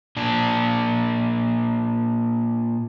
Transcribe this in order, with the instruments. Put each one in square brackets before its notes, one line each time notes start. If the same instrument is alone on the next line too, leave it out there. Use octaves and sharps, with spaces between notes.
[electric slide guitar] A#2 D4